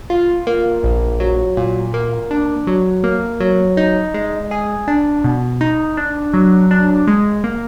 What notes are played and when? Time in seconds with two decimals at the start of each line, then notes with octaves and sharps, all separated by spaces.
0.10 F4
0.47 A#3
0.83 A#1
1.20 F#3
1.57 A#2
1.94 A#3
2.31 D4
2.67 F#3
3.04 A#3
3.40 F#3
3.77 D#4
4.14 G#3
4.51 G#4
4.88 D4
5.24 B2
5.61 D#4
5.97 D4
6.34 F#3
6.71 D4
7.07 G#3
7.44 A#3